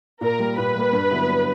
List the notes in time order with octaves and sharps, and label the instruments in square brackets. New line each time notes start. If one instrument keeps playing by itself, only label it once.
[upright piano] A#2 [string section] A#4
[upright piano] G3 A#3
[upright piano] A#2 [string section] B4
[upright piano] G3 A#3
G2
D3 F#3 B3 E4
G2